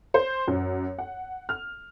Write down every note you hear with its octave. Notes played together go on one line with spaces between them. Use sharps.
C5
F#2
F#5
F6